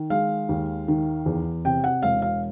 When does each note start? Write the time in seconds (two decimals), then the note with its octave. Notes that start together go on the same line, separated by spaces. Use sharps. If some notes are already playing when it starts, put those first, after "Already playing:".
Already playing: D#3
0.10 G#3 F5
0.49 D#2
0.88 D#3
1.26 E2
1.65 C3 G5
1.84 F#5
2.02 E1 F5
2.22 F5